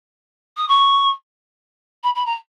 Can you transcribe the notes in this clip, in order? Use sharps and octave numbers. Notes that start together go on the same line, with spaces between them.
D#6
C#6
B5
B5
A#5